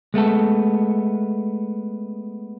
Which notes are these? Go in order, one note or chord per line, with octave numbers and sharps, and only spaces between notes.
G#3 A3 B3 A4